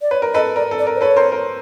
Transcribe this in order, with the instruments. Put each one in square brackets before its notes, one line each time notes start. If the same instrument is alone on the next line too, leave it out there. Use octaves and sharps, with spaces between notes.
[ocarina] D5
[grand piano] B4 [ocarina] C#5
[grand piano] A#4
[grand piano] A4 B4 [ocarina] D#5
[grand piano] A#4 [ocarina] D5
[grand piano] A4
[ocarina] D5
[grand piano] A#4
[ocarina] C5
[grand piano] A4 B4 [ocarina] C#5
[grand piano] A#4 C5
A#4